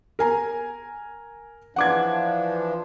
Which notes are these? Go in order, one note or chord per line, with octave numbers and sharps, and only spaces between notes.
A#4 G#5 A#5
E3 F3 D4 F#5 D6 G#6